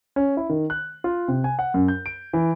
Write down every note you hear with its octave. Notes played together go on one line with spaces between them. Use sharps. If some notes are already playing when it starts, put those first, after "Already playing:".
C#4
E4
D#3
F#6
F4
C3
G#5
F#5
F#2
G6
D7
E3